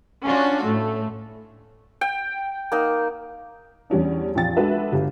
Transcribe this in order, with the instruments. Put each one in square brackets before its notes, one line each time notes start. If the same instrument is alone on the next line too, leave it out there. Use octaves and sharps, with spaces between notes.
[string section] C#4 D4 F4 F#4
A2 A3
[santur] G5
A#3 D#4
[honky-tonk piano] E2 G3 C#4 D4
A#1 F2 G5 A6
G#3 D4 F#4 A4 B4 E5
G1 G4